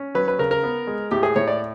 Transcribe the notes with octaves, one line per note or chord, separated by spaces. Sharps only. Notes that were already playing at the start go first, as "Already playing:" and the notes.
Already playing: C#4
F#3 B4
B4
C#3 A#4
A#4
B3
G#3
A2 G4
G#4
A2 C#5
D5